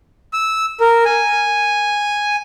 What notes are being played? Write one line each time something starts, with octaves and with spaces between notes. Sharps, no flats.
E6
A#4
G#5